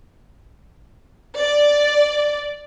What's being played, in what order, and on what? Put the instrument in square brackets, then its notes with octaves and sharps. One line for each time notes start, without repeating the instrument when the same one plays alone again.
[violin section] D5